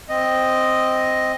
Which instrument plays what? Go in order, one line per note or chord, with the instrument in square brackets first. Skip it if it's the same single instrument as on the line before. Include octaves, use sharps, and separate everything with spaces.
[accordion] C4 D#5